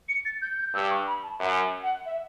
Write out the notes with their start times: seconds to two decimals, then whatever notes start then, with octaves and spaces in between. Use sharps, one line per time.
0.09 C#7
0.25 A6
0.42 G6
0.59 G6
0.74 G2 E6
0.90 C#6
1.07 B5
1.23 A5
1.39 F#2 E5
1.83 F#5
2.06 E5